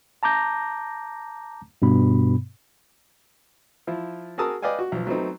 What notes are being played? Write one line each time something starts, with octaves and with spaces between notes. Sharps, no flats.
A5 A#5 D6 G6 A#6
G2 B2 B3 B5
F3 E4 F4
F#4 G#4 A#4 A5 D#6 E6
B4 D5 D#5 F5 G5 G#5
F#4
B1 F3
F#3 A3 B3 C4 D#4